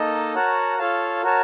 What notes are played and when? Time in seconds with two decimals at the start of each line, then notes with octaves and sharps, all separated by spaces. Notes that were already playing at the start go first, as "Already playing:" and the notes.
Already playing: A#3 D#4 A4 D#5 A5
0.35 F#4 A#4 C#5 F#5 A5
0.78 F4 A4 C#5 F5 A5
1.23 F#4 A#4 C#5 A5